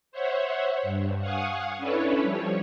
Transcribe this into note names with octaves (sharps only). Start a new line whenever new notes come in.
C5 C#5 E5 F#5
G2
F5 F#5 G#5 C#6 D#6
C#4 D4 E4 A4 B4 C#5
F3 G3 C#5